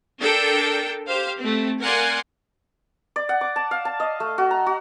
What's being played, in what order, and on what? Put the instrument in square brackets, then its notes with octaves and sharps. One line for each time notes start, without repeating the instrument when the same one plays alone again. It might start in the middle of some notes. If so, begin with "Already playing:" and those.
[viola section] D4 A4 A#4 G5
G4 C5 F5
A3 C4
A#4 D5 F5 F#5 G#5 C6
[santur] D5
F#5
D6
A5
F5
A5
D#5
A3
F#4
A#5
F#4